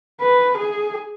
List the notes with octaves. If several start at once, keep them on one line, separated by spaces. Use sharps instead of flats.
B4
G#4